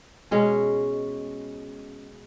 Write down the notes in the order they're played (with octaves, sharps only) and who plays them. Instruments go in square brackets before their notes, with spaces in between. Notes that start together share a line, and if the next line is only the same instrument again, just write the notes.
[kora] B2 G#3 C#4